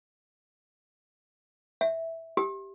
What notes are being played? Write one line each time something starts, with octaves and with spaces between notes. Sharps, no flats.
E5
G4